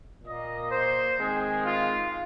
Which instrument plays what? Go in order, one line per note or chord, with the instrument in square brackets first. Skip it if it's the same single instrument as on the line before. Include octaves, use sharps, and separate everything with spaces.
[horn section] A#2 A#3 D#5
C5
D#3 G#3 C4 G#4
F4